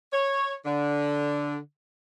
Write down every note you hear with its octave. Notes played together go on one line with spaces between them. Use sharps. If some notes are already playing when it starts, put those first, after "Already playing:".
C#5
D3